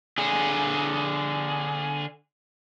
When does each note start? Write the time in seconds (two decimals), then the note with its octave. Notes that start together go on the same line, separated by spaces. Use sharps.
0.18 D3 G#4